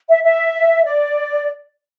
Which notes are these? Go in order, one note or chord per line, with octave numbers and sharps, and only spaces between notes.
E5
E5
D5